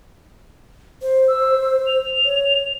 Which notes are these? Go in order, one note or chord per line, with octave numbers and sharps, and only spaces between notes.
C5
E6
F7
C#5